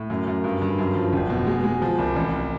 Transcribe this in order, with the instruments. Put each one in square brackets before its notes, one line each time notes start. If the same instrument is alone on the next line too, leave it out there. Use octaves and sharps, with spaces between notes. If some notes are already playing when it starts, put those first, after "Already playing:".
Already playing: [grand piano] A2
F#2
F#2
G2
G2
F#2
F3
F1
B2
G#3
G#3
F3
C2
A1